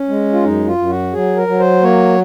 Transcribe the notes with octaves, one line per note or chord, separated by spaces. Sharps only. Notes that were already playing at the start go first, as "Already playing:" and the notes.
Already playing: C#4
G#3
F4
F#2 D#4
F4
F#2
F#4
F#3 G#4
A#4
F#3
C5
A#3 C#5